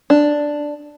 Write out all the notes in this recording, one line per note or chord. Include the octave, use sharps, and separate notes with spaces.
D4